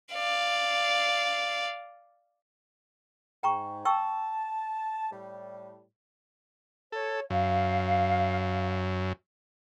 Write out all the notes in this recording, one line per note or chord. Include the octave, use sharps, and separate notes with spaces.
D5 F5
G#2 G5 A#5 C#6
G5 A5 C#6 E6
A2 G3
A4 C#5
F#2 F5